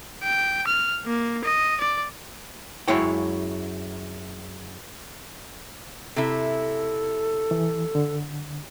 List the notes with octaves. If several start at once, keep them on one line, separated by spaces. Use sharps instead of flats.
G5
F6
A#3
D#5
D5
F#2 G#3 E4 C#5 G5
C3 E4 A4
E3
D3